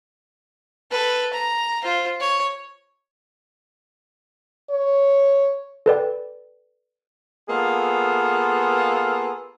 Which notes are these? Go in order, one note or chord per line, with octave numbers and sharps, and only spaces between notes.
A4 B4
A#5
F4 C5
C#5
C#5
A4 B4 D5 G5
A#3 B3 F4 G#4 A4